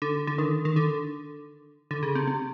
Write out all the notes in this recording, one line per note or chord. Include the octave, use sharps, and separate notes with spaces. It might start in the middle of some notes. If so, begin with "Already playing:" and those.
D3
D3
D#3
D#3
D3
D3
C#3
C3
C3